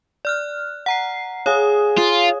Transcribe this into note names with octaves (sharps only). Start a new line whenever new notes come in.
D5 F6 F#6
F#5 A#5 C7
G#4 C#5 F5 D#6
F4